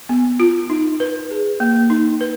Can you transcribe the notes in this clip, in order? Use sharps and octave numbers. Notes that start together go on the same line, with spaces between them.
B3
F4
D#4
B4
G#4
A#3
D#4
B4